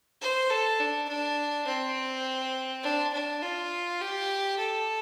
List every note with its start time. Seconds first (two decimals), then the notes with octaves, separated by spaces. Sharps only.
0.21 C5
0.50 A4
0.80 D4
1.08 D4
1.67 C4
2.83 D4
3.13 D4
3.42 F4
4.01 G4
4.58 A4